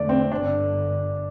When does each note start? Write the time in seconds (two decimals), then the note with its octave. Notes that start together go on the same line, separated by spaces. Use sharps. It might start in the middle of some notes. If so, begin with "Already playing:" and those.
Already playing: E2 D3 A3 D5
0.09 C4
0.31 G1 G2 D3 D4